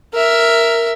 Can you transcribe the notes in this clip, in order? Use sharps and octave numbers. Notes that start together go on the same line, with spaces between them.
A#4 E5